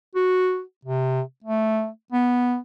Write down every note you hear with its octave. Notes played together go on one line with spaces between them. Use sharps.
F#4
C3
A3
B3